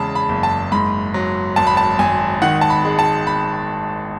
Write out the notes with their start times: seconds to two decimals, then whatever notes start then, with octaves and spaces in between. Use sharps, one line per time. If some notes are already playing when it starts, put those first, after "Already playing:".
Already playing: E2 C#3 G#3 A5 B5
0.15 B5
0.29 F#1
0.43 A5
0.72 G#2 B5
1.14 F#3
1.56 G#1 A5
1.67 B5
1.77 A5
1.99 G#1 G#5
2.42 D#3 F#5
2.61 A5
2.70 B5
2.85 G#3
2.99 A5
3.27 B5